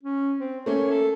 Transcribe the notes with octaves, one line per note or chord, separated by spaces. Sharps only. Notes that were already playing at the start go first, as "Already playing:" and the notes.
C#4
C4
A3 A#3 C#4 C#5
A4